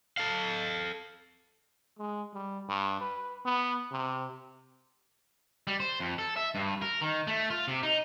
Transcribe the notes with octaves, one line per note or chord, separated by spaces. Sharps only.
A4 F5
G#3
G3
G2
B4
B3
C3
G3
C5
F2
A4
E5
G2
A#4
D#3
A3
F4
C3
D#4